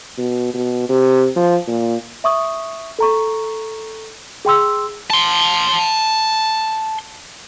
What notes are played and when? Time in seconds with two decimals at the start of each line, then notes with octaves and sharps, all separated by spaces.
0.18 B2
0.54 B2
0.89 C3
1.36 F3
1.67 A#2
2.24 E5 C#6 D#6
2.99 A4 A#5 C#6
4.45 G#4 G5 C6 E6
5.10 A5 C6